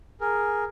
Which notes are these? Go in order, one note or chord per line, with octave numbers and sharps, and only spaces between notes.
G#4 A#4